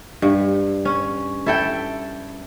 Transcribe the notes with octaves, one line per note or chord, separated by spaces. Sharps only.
G2
C#4
E4 A4 G5